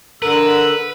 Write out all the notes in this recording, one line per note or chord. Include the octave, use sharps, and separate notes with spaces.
D3 A#4 B4 E6